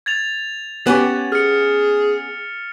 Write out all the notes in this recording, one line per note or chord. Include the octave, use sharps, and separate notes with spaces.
G#6 A6 F7
B3 C#4 G4 E7
G#4 F6 C#7